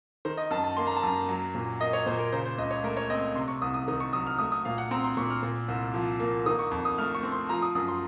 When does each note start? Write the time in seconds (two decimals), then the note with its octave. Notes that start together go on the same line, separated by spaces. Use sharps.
0.25 D#3 C5
0.37 D#5
0.51 F#2 A5
0.64 A5
0.77 A#3 C6
0.87 A#5
0.96 A5
1.03 F#2 A#5
1.29 F#3
1.55 A#2
1.80 A#3 D#5
1.93 C#5
2.06 A#2 C5
2.19 A#4
2.32 C#3 C5
2.45 C5
2.58 C#2 D#5
2.71 C#5
2.83 A3 A#4
2.97 C#5
3.10 C4 D#5
3.35 C3 C6
3.48 C#6
3.62 C2 D#6
3.74 D#6
3.88 D#3 D#6
4.00 C#6
4.13 F#3 D#6
4.26 F6
4.38 A3 D#6
4.52 D#6
4.65 A#2 F5
4.78 F#5
4.91 C4 A#5
5.04 C6
5.17 A#2 C#6
5.30 F6
5.43 A#2
5.68 C2
5.94 F3
6.20 A#3
6.46 D#3 D#6
6.59 C#6
6.71 F2
6.85 D#6
6.98 A3 F6
7.15 C#6
7.23 C4
7.32 C6
7.49 F3 A#5
7.62 D#6
7.75 F#2 D#6
7.88 C6